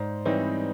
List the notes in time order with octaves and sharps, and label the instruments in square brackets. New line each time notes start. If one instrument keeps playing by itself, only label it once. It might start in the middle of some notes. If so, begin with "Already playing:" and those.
Already playing: [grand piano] G#2 [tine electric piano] C5 D5
[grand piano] E3 G3 C4 D#4 [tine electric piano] B4 C#5